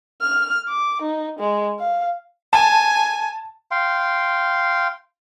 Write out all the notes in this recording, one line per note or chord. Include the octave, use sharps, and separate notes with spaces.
F6
D6
D#4
G#3
F5
G#5 A5
F5 G5 C6